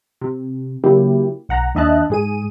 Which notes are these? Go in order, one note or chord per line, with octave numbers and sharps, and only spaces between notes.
C3
C#3 F#3 A#3 E4 G4
B1 F#5 A#5
D#2 D4 D#5 E5 A5 F#6
G#2 G#4 D#7